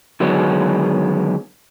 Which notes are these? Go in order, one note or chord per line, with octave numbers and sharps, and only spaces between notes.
D3 D#3 F#3 G#3 B3